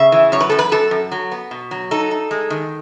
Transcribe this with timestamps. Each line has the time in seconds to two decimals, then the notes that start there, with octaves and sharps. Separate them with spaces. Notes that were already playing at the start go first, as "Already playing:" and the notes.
Already playing: C#3 E5
0.12 E3
0.32 F#2 C#5
0.40 B4
0.50 F#2 A4
0.59 B4
0.72 F#2 A4
0.91 F#2
1.12 F#3
1.32 B3
1.51 B2
1.71 F#3
1.91 D#4 A4
2.11 D#4
2.31 G#3
2.50 D#3